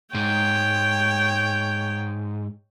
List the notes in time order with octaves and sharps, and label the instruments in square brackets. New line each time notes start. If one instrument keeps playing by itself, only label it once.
[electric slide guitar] G#2 [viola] C#5 G5